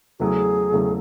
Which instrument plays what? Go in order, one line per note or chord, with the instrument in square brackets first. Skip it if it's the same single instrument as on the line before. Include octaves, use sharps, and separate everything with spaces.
[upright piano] E2 C#3 F#3 A3 [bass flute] G#4
[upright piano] E2 C#3 F#3 A3